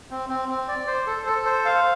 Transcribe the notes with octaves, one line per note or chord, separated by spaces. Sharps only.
C4
C4
C4
D5
C5
A4
A4
C5
F5